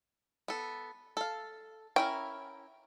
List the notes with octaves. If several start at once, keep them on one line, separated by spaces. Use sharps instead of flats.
B3 A4
A4 F5
C#4 E4 A#4 G5